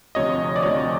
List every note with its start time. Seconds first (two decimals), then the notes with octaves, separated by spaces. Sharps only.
0.15 D2 C3 F3 C#5 D#5
0.56 D5
0.62 D2 C3 F3 C#5 D#5